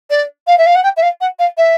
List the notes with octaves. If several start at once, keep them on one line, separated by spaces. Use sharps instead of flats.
D5
F5
E5
F5
F#5
G5
E5
F5
F#5
F5
E5